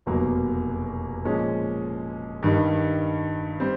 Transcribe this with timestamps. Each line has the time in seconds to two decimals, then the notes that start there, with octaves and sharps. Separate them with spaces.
0.06 F1 E2 B2 F#3 A#3
1.25 A#2 F3 G#3 C#4
2.43 G2 D#3 G3
3.60 G3 C4